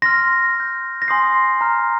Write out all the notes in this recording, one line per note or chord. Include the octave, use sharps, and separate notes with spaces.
C6 F6 A#6
C6 G6
A#6
G#5 C6 D#6 G6 C7
A#5 F6